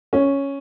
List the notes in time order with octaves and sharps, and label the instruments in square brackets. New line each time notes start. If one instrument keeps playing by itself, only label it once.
[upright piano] C#4